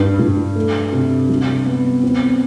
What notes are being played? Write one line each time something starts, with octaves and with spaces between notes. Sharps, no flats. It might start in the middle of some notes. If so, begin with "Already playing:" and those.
Already playing: G2
G2
A3
C3
G3
B3
C4